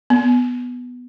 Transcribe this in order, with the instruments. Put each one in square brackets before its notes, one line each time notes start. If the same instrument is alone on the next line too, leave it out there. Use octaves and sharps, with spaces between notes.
[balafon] B3